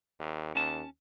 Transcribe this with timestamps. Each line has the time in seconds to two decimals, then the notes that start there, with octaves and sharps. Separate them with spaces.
0.19 D#2
0.55 D#2 C#4 A5